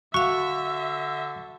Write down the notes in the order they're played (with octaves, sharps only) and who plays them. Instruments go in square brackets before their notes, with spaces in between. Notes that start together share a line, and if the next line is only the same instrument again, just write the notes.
[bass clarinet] D3 [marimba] F#4 F5 [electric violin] E5 [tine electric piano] C#6